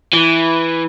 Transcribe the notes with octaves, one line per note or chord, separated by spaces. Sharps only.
E3